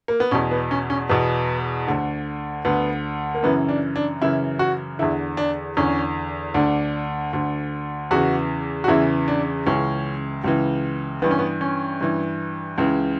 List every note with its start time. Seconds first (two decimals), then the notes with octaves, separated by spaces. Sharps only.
0.08 A#3
0.20 B3
0.31 E2 B2 C#4
0.51 B3
0.71 C#4
0.90 C#4
1.09 E2 B2 B3
1.87 D2 D3
2.65 D2 D3 B3
3.34 A#3
3.42 F#2 C#3 E3 B3
3.69 D4
3.96 D4
4.21 F#2 C#3 E3 E4
4.59 F#4
4.99 E2 D3 E4
5.37 D4
5.77 E2 D3 C#4
6.54 D2 D3 D4
7.33 D2 D3
8.11 E2 C#3 E3 F#4
8.84 F#4
8.88 E2 C#3 E3 E4
9.28 D4
9.66 C#2 C#3 E3 C#4
10.44 C#2 C#3 E3
11.22 G2 E3 B3
11.31 C#4
11.39 B3
11.61 C#4
12.01 G2 E3
12.78 C#2 C#3 E3